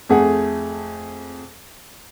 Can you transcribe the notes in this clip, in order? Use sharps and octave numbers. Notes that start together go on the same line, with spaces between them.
F2 A3 G#4 F#5